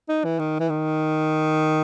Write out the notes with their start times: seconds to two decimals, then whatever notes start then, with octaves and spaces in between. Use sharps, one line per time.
0.09 D#4
0.25 E3
0.39 D#3
0.60 E3
0.69 D#3